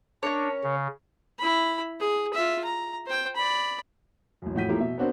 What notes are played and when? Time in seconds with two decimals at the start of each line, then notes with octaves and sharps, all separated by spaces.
0.23 C#4 D4 A#4 C#5
0.64 C#3
1.39 E4 B5
2.00 G#4
2.33 F4 E5
2.64 A#5
3.06 C5 G5
3.35 D5 B5
4.42 A1 F#2
4.55 F2 A2 F#4 G6 B6 D#7
4.69 F3 A3 A#3 E4 G4
4.80 B2 E5
4.98 B3 C4 D4 F#4 A#4 C5